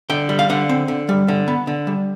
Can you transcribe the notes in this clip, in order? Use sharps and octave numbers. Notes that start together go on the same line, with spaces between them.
D3 G5
G3
F5
D3 F#5
C4
D3
G3
D3
B3
D3
G3